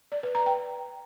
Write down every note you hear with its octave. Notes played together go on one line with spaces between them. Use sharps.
D5
B4
A#5
G5